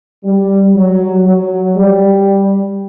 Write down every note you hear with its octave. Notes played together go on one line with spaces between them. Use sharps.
G3
F#3
F#3
G3